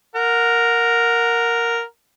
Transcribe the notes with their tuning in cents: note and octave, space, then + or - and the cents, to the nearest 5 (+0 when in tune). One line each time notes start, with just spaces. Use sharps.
A#4 +0 F#5 -20